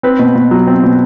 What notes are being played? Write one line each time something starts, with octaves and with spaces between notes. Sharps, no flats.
C4 B4
B2
B2
F#3
C4
B2